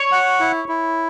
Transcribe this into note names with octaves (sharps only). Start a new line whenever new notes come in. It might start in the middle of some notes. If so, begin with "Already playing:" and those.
Already playing: C#5
F#5
E4
E4